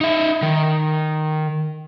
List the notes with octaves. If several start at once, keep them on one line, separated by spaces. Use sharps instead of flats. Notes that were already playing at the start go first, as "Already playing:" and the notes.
D#4 E5
D#3